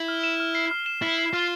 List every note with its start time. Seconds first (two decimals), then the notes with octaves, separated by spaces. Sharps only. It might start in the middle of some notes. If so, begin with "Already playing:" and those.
Already playing: E4
0.08 F6
0.24 E7
0.40 F6
0.55 C7
0.71 F6
0.86 E7
1.02 E4 F6
1.19 C7
1.33 F4 F6